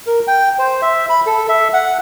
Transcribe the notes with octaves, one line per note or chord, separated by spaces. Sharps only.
A#4
G5
C5
E5
B5
A4
E5
F#5